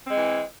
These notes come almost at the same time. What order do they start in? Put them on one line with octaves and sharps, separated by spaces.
C4 G#3 E3